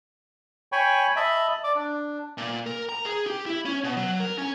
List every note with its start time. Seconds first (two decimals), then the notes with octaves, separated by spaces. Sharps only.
0.72 C#5 G5 G#5 B5 C#6
1.16 D#5 E5 A5 B5
1.64 D5 D6
1.75 D4
2.38 A#2
2.66 A#4
2.89 A#5
3.05 G#4
3.27 G4
3.46 E4
3.65 C#4
3.84 B2
3.97 F#3
4.20 A#4
4.38 C#4